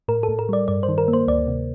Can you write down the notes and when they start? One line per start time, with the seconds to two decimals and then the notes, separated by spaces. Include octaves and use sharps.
0.08 A2 A#4
0.23 A4
0.28 A2
0.39 A#4
0.49 G3 D5
0.68 G2 D5
0.83 C5
0.88 D#3
0.98 A#4
1.08 A#3
1.13 C5
1.28 D2 D5
1.48 C3